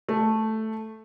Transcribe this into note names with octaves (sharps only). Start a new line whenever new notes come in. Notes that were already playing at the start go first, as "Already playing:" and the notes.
A3